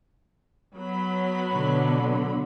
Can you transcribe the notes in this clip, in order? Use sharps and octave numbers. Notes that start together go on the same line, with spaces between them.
F#3 B3 B5
B2 D3